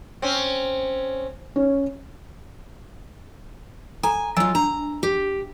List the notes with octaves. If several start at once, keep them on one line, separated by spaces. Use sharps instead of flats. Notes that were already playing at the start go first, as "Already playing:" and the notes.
C4 C#4
C#4
A4 G#5 A#5
F#3 F4 D#5 G#5 E6
D4 A#5
G4